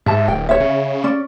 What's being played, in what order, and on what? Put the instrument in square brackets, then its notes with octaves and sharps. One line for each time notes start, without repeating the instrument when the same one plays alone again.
[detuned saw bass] G#2 [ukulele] E5 A5
[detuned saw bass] D1 [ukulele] G5
[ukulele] C#5 E5
[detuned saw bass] C#3
[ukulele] C#4 D5